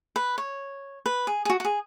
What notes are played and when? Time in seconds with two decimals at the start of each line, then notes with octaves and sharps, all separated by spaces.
0.16 B4
0.38 C#5
1.06 B4
1.27 G#4
1.45 G#4
1.50 F#4
1.60 F#4
1.65 G#4